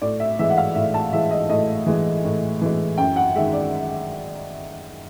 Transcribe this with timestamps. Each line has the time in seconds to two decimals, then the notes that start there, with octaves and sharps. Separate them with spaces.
0.02 A2 D5
0.20 E5
0.39 E3 G#3 E5
0.50 F#5
0.58 F5
0.75 A2 E5
0.94 A5
1.13 E3 G#3 E5
1.31 D#5
1.49 A2 D#5
1.86 E3 G#3
2.25 A2
2.62 E3 G#3
2.98 F#2 G5
3.16 F#5
3.35 D#3 G#3 E5
3.53 D5